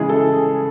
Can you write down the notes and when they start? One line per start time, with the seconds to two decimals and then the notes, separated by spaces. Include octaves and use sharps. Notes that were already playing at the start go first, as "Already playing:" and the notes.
Already playing: C#3 E3 G#3 G#4
0.09 A4